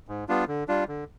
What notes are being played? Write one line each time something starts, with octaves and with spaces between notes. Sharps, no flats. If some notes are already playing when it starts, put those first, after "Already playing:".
G#2
G3 B3 D4 F4
D3
G3 D4 F4
D3